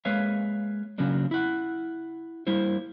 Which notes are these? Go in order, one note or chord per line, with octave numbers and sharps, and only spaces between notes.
G#3 A#3 B4 C#5 E5 F5
C#3 F#3 A#3 C#4 D4
E4 F#5
G3 A#3 E4 C5